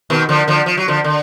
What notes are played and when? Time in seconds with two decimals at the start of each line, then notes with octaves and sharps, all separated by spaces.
0.10 B2 D#3
0.29 D3 F3
0.48 D3 F3
0.66 F3
0.77 F#3
0.88 D3 F3
1.04 D3